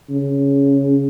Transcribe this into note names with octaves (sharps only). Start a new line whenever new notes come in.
C#3